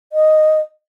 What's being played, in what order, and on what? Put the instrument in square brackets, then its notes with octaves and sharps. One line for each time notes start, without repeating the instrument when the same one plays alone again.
[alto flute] D#5